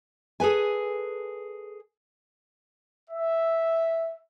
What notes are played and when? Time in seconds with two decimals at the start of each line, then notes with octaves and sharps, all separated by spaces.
0.40 G#4 A4 B4 G#5
3.10 E5